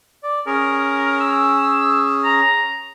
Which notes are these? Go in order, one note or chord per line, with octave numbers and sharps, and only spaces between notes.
D5
C#4 G#4 A#4
E6
A#5